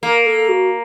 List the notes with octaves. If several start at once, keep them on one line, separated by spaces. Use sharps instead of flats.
A#3 A#4
A4
F#4